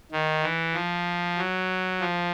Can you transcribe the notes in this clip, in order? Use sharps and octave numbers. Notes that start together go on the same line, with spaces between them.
D#3
E3
F3
F#3
F3